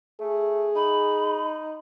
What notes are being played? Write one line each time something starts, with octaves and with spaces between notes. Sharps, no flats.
A3 G#4
D#4 B5